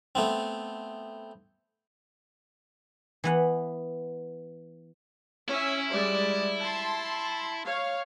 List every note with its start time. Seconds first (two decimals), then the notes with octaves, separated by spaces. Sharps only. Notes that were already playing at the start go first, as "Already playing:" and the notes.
0.15 A3 B3 C4
3.24 E3 B3 F#5
5.48 C#4 E4 E5
5.92 G3 G#3 D5
6.61 A5 C6
7.64 C#5 F5